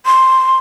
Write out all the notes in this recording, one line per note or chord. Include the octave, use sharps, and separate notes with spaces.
C6